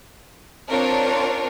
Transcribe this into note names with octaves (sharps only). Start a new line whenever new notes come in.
C4 D4 F4 A#4 C#5